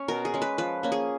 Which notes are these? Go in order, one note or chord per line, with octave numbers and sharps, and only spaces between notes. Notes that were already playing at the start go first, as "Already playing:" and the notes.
Already playing: C#4 C#5
B2 A#4
G#4
G#3 C#4
B4
F3 B4
A#3 C#4
G#4